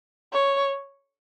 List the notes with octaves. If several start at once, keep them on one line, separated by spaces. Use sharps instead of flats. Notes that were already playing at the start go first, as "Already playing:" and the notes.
C#5